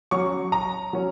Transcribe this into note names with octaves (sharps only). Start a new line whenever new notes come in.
F#3 C#4 C#6
A#5
F#3 C#4